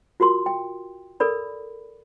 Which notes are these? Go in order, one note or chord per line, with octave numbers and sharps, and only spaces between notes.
F4 F#4 A#4 C6
G5
A4 A#4 D5 B5